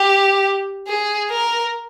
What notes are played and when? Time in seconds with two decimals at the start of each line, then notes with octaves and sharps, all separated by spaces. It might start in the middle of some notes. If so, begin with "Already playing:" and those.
Already playing: G4
0.87 G#4
1.31 A#4